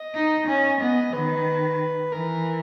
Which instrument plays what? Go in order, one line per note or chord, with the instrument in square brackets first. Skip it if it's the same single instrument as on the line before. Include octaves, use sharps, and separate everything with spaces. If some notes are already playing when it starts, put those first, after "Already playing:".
Already playing: [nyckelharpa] D#5
[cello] D#4
C#4
[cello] B3 [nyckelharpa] D#5
[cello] D#3 [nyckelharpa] B4
[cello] E3 [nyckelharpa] A#4